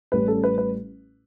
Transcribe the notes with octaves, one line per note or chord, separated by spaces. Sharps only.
A1 A2 G3 C#4 B4
A4
B4
B4